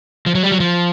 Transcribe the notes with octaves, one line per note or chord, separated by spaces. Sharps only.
F3
F#3
G3
F#3
F3